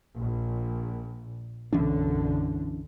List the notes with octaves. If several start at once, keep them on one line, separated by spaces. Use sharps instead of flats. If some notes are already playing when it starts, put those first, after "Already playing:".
A#1 A#2
B1 F#2 D3 E3 C#4 D4